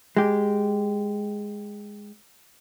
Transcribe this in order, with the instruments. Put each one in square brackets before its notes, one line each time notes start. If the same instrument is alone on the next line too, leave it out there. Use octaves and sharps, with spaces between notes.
[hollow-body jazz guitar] G#3 G4